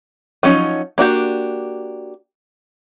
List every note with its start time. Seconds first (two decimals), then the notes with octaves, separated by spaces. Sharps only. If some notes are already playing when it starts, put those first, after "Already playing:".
0.43 F3 F#3 C#4 D#4
0.98 A#3 D4 F#4 G4